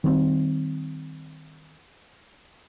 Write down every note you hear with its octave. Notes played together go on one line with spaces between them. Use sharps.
D#3 G3 G#3 C4